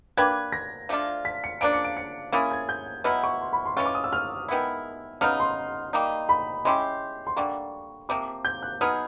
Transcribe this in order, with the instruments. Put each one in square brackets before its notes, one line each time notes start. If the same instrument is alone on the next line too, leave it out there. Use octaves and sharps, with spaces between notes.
[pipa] A#3 D4 G4 B4 [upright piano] G#6
[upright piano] A#6
[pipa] F3 A3 D4 F4
[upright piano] B6
C#7
[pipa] C#3 F3 A#3 D4 [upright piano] D7
[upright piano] C#7
D7
C#7
[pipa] A#3 C#4 E4 G#4 [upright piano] A6
[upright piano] G#6
G6
[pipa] B2 F#3 B3 E4 [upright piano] F6
[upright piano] C#6
C6
B5
C6
[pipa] E3 G#3 C#4 F4 [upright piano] C#6
[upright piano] D6
D#6
E6
F6
[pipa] D#3 G#3 B3 E4
[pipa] C#3 F#3 B3 D#4 [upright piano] F6
[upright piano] C6
[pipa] G3 A#3 D#4
[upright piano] B5
[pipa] G#3 C#4 E4 G4 [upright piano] C6
[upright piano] C6
[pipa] D3 G3 A#3 [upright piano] C#6
[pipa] C3 F3 A#3 [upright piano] D6
[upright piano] G6
F#6
[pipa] F#3 B3 D#4 G#4 [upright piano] F6